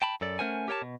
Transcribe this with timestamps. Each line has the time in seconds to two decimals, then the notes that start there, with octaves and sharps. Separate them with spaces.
0.02 G5 A5 B5
0.21 F#2 A4 D5
0.39 A3 C#4 A#4 C5 F#5 G#5
0.68 G4 A#4 C#5 G5 A5
0.82 B2